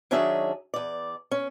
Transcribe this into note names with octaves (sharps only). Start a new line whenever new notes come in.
D#3 F#3 C#4 D4 G#4 E5
E2 D5
C#4